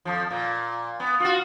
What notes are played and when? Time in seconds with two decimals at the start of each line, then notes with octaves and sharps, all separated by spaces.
0.05 F2 F3
0.31 A#2
1.00 B3
1.20 F4 F#4